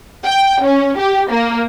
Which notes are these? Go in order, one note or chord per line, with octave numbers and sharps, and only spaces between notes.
G5
C#4
G4
A#3